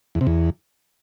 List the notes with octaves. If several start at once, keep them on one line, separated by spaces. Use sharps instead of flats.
E2
C3
E2